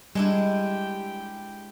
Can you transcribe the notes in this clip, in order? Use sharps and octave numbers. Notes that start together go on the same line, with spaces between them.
G3 G#3 D4 E4 G4 G5